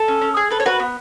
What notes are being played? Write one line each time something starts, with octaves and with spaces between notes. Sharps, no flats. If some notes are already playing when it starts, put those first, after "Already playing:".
Already playing: A4
C#4
C#4
G#4
A4 B4
C#5
F#4 B4
B3